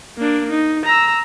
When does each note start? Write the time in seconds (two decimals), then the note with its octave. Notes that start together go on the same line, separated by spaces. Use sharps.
0.17 A#3 D4
0.50 D#4
0.85 A#5 E6